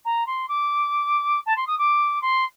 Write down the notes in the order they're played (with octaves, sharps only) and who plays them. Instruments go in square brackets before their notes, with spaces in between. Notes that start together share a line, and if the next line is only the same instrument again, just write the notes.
[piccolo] A#5
C6
D6
A5
C6
D#6
D6
C6